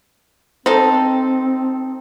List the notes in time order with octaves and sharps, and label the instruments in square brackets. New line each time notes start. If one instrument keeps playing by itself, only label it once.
[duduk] C4 [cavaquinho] D#4 A4 [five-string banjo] C5